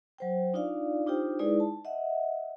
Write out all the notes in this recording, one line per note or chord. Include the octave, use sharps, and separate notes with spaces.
F#3 C5 G5
D4 D#4 F4 D5 F5
D4 D#4 F4 G4 C5 G5
G#3 D#4 E4 G#4 B4 D5
A5
D#5 E5 F#5